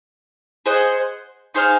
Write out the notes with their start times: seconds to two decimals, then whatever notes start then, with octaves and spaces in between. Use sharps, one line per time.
0.66 G#4 C5 D#5 F#5
1.54 D#4 G#4 C5 F5